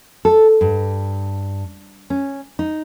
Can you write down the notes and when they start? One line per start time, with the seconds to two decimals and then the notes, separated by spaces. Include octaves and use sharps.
0.25 A4
0.61 G2
2.10 C#4
2.59 D#4